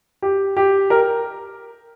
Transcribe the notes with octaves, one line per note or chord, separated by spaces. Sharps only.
G4
G4
A#4